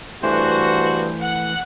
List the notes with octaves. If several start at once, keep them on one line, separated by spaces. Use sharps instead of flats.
G2 E3 A3 F#4 C5
F#5